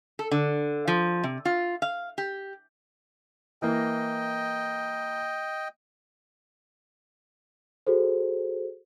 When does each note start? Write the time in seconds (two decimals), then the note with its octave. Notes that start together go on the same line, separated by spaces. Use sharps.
0.19 A4
0.31 D3
0.88 F3
1.24 C3
1.45 F4
1.82 F5
2.18 G4
3.62 E3 A#3 D#5 G5
7.87 F#4 G#4 A4 C5